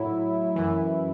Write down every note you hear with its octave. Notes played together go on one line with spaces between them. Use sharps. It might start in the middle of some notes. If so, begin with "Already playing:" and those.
Already playing: A2 F#3 E4
F#2 E3